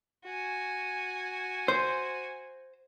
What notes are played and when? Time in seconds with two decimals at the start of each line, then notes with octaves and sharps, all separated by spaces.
0.25 F#4 G#5
1.68 C5